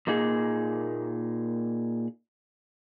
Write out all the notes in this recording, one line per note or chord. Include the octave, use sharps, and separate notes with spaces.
A#2 A#3 D#4 G#4